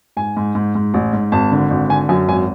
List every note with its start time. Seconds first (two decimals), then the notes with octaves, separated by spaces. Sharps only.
0.17 G#2 G#5
0.37 G#2
0.55 G#2
0.75 G#2
0.94 A1
1.13 G#2
1.32 G#1 A5
1.52 D3
1.70 G#1
1.89 D3 G#5
2.09 F#2 G#5
2.28 G#1 G#5